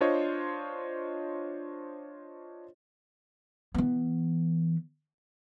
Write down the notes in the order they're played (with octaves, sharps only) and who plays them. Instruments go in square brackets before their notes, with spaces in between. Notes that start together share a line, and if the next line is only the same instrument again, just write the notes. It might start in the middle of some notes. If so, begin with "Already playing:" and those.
[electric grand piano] D4 F4 C5 C#5 D#5
[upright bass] E3 B3